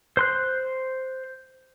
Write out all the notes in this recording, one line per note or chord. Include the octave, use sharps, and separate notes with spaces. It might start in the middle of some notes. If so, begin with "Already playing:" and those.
C5 C6 F#6